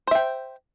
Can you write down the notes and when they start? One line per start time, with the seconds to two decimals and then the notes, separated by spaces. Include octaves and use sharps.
0.07 C5
0.11 E5
0.15 G5